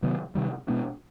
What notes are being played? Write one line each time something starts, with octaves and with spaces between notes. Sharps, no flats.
C3 D#3 F#3 B3
C3 D#3 G3
B2 G#3 B3 D4